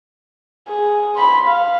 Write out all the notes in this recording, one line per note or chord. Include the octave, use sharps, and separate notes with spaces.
G#4
B5 C6
F5